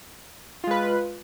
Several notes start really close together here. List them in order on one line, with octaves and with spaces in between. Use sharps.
F4 G#3 B4